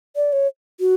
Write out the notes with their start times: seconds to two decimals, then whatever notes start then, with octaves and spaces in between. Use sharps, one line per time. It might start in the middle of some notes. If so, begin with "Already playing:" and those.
0.16 D5
0.33 C#5
0.80 F#4